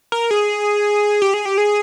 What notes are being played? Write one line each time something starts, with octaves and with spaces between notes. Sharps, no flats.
A#4
G#4
G4
G#4
G4
G#4